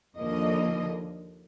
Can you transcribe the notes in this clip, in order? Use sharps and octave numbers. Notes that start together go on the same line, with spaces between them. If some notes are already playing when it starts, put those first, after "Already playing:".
D#2 D3 F3 A#3 D#5